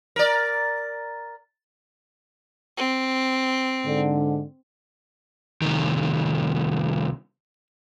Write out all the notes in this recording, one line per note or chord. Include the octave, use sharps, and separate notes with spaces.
A#4 D5
C4
G#2 D3
C2 D#3